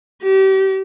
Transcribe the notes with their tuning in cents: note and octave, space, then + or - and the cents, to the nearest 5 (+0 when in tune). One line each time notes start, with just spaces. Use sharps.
G4 -35